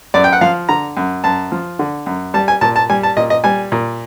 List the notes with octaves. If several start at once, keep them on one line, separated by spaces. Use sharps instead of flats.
F#2 D5
G5
F#5
F3 F5
D3 A#5
F#2
F#2 A5
F3
D3
F#2
G3 A5
G#5
A#2 A5
A5
G3 G#5
A5
A#2 D#5
D#5
G3 G#5
A#2